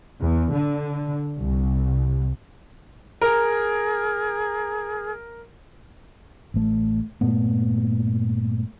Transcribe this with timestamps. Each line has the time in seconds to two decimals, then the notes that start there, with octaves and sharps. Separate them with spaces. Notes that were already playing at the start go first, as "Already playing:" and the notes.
0.21 E2
0.52 D3
1.38 C2
3.21 G#4 A#4
6.54 A1 A3
7.21 G2 A#2 A3 B3